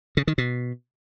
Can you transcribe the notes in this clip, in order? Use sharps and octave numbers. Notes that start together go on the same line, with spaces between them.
C#3
D#3
B2